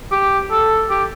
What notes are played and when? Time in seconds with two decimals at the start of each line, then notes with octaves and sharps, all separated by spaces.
0.11 G4
0.51 A4
0.90 G4